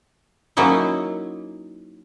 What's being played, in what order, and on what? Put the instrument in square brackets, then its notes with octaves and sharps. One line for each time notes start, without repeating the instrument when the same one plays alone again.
[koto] F#3 A#3 C#4 D#4 E4